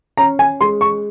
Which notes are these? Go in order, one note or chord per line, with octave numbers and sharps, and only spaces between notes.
C#4 A#5
G#5
G#3 C6
C#6